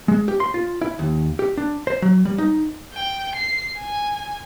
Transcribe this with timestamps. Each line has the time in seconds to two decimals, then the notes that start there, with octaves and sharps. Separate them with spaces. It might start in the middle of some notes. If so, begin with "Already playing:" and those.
0.08 G#3
0.28 G4
0.40 C6
0.54 F4
0.81 E4
0.99 D#2
1.39 G4
1.57 D4
1.87 C5
2.02 F#3
2.25 G3
2.38 D#4
2.94 G5
3.36 C7
3.77 G#5